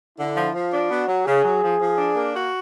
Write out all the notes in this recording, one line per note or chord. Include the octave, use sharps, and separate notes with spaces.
D3 E4
F3
F3 F4
D4
B3 F#4
F#3
C#3 G#4
F#3
F3
F3
D4
A#3
F#4